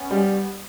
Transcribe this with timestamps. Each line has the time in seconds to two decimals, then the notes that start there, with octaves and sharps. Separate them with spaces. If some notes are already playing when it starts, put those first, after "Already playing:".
Already playing: B3 C#4
0.11 G3